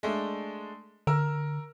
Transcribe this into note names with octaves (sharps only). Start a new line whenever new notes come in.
G#3 A3 D4
D3 A#4 E6 F6